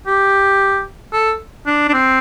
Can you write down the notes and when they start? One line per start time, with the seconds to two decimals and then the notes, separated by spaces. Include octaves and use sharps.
0.07 G4
1.13 A4
1.66 D4
1.89 D4
1.94 C4